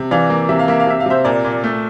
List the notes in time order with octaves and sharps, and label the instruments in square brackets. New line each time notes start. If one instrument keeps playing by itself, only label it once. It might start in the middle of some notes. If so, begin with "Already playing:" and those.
Already playing: [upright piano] C3
E3 D5 F5
A#3
C3 E5
F5
A#3 E5
F5
C3 E5
F5
C3 C5 E5
A#2 A#4 D5
A#2
A3